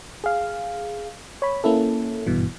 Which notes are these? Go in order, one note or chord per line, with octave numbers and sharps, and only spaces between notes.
G#4 F5
C#5 B5
A#3 C#4 E4 A4
G#1 G2 B2 E3